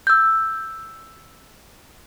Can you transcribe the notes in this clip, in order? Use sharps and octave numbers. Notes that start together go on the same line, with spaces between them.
E6 G6